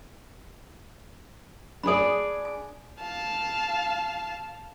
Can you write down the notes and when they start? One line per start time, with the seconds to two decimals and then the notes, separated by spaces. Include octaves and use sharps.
1.83 D4 G#4 D5 B5 D#6
2.45 G#5
3.01 F5 A5